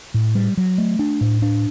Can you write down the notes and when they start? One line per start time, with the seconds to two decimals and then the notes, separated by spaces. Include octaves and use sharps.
0.14 A2
0.35 G3
0.57 F#3
0.78 A3
0.99 D4
1.21 A2
1.42 D4